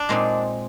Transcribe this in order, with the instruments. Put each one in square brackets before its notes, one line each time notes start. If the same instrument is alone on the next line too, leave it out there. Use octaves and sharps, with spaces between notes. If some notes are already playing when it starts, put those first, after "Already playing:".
Already playing: [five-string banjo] D4
[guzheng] A#2 G#3 C4 D#4